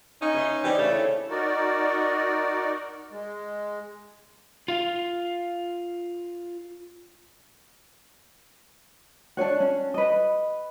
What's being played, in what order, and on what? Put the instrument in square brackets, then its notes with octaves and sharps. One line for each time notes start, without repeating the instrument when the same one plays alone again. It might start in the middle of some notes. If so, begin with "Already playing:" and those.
[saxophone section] C#4 D#4
[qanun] B4 E5 C6
[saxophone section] E3 D#4 G4 [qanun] D4 C5
[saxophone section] C#3 A3 [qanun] C#5
[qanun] E4
[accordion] D#4 F#4 A#4 D5
G#3
[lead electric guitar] F4 F5
[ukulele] D4 F4 C#5 F#5
C#4
B4 D#5